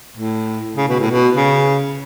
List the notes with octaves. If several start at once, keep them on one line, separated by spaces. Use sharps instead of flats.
A2
C#3
B2
A2
B2
C#3